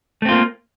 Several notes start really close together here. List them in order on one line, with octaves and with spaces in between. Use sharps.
A3 C4 F4 A#3